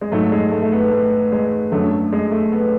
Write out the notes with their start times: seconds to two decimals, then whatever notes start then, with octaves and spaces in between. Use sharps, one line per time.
0.01 G#3
0.11 G#2 F#3 A3
0.32 G#3
0.52 A3
0.62 A3
0.72 B3
0.91 A3
1.32 G#3
1.72 F#2 D3 F#3 A3
1.91 A3
2.12 G#3
2.32 A3
2.52 B3